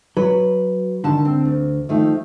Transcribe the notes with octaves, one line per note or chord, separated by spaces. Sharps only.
F#3 B4
D3 D#3 A5
C4
D2
D#3 F3 A3